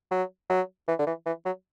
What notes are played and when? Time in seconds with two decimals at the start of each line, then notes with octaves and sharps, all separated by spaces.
0.11 F#3
0.50 F#3
0.88 E3
0.99 D3
1.07 E3
1.26 E3
1.45 F#3